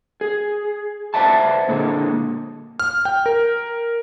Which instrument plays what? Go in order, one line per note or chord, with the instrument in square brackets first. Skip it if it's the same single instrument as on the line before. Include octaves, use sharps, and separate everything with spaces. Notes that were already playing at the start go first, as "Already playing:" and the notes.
[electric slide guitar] G#4
B4 C5 D5 E5 F#5 A5
A#2 D3 G#3
[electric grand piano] F6
G5
A#4